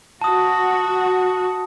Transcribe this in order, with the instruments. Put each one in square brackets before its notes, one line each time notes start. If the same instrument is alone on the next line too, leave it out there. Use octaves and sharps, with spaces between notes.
[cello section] F#4 [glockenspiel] A5 D#6